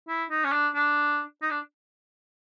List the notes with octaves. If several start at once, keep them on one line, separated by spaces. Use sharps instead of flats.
E4
D#4
C#4
D4
D4
D#4
D4